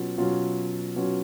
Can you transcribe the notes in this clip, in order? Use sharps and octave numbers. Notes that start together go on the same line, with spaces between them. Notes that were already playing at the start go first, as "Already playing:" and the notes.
Already playing: B2 F#3 C#4 F4
B2 F#3 C#4 F4
B2 F#3 C#4 F4